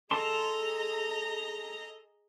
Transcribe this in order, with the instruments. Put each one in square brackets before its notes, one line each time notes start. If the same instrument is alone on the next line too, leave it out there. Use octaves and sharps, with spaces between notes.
[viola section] G#4 A#5 [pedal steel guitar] A4 A5 C6 [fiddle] D#5